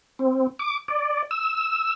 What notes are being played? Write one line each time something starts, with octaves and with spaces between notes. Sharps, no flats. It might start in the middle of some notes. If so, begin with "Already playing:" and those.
C4
D6
D5
E6